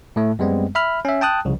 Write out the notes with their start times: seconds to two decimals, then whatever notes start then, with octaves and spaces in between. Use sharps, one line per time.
0.16 A2 A3
0.39 F#2 G3 G#3 B3 C4
0.75 E5 B5 F6
1.05 C#4 E5
1.21 G5 A5 D#6 F#6
1.45 C2 C#3 F3